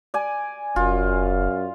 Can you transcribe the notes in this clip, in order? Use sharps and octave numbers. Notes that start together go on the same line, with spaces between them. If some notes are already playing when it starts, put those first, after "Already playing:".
D5 G#5
F1 F#2 F4